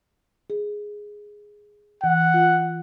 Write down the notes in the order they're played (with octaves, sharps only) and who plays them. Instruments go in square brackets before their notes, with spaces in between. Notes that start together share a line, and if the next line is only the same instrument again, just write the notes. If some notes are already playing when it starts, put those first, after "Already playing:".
[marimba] G#4
[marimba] E3 [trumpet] F#5
[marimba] F4